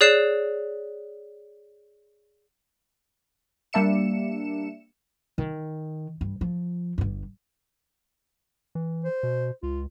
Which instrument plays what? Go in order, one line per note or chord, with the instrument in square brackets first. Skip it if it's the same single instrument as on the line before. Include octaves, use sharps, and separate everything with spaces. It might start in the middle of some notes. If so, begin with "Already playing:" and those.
[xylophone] G#4 C#5 D5 F#6 C7 E7
[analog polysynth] G3 A#3 D4 E5 C#7 E7
[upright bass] D#3
G2
F3
G1 G2
[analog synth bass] E3
[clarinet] C5
[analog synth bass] B2
[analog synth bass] C#2 [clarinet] F4